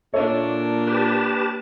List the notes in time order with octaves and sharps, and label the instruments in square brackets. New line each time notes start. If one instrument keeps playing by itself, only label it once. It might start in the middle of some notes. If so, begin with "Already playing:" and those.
[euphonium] A#2 [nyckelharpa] A#3 D4 [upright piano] A4 C#5 E5
[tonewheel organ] G4 B4 A5